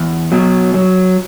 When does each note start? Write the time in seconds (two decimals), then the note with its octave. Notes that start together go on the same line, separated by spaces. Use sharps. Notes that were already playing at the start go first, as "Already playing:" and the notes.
Already playing: E2
0.32 B2 F#3
0.74 F#3